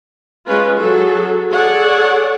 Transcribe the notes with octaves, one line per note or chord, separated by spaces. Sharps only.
G#3 C#4 F4 B4
F#3 G#4 A4
G#4 A4 C#5 D5 F#5